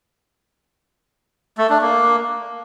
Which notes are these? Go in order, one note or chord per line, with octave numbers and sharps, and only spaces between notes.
A3
D4
A#3